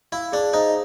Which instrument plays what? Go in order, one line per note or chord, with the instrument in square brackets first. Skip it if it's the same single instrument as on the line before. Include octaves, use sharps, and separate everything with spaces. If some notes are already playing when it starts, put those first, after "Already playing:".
[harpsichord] E4 [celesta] F5
[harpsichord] D4 [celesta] G#4
[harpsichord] D#4 [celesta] C5